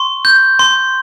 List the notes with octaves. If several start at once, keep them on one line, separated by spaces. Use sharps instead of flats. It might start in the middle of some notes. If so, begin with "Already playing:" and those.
Already playing: C6 C#6
G6
C6